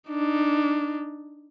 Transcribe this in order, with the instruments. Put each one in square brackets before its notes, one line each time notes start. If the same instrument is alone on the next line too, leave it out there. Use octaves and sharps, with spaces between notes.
[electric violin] D4 D#4